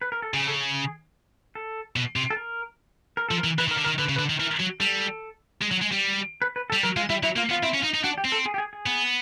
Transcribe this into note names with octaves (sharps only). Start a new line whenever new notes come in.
B4
A#4
A4
C#3 G#4
A4
G#4
A4
B2
C3
A4
A#4
A#4
F3 A4
A#4
E3
E3 B4
D#3 A#4
D3
A#4
D#3
D3 B4
C#3
B4
D3
D#3
E3 A#4
F#3
G3 A4
G#3
F#3
G#3
G3
B4
B4
A4
G3
F#3 A#4
G#3 F4
G3 E4
F#3 E4
A#3 F4
B3 F4
C4 E4
C#4 F4
D#4
D#4
D4 F#4
G4
C4
A4
G#4
G4
G#4
G#4
B3